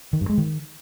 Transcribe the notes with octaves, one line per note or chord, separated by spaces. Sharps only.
D#3
G2
G#3
D#3